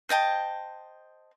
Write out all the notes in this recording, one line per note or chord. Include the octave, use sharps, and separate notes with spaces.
C5 D#5 G5 A5